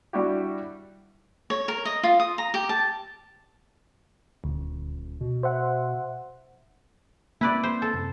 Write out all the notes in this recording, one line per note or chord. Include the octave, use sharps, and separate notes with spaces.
G3 D4 E4 F#4 G4
C#5
A#4
D#5
F4
D#6
A#5
G4
A5
D#1 D2
B2
C5 E5 F#5
A#3 C4 E4 B4 D5
C5
A4
F#2 C3